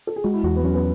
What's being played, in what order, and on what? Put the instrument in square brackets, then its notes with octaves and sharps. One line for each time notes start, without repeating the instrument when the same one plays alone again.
[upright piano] A4
G#4
[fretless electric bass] G#3 [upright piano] F#4
[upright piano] E4
[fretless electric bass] E2 [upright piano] F#4
[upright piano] B3
[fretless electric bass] F#3 [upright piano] C#4
[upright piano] B3